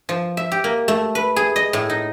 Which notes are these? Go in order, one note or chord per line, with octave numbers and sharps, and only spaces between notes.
F3
E5
G4
A#3
A3
B4
G#4
D#5
A2
D#4